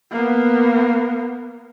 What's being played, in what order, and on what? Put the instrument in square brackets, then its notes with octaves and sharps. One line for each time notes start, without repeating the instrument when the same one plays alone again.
[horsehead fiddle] A#3 B3